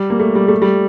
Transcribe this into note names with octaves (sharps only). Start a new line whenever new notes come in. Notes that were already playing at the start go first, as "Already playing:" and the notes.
Already playing: G3
A#3
A3
G3
A3
G3